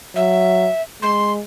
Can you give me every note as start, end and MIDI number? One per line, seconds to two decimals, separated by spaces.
0.15 0.70 54
0.15 0.81 76
1.02 1.42 56
1.02 1.32 84